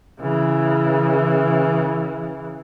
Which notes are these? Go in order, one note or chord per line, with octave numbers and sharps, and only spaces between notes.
C#3 E3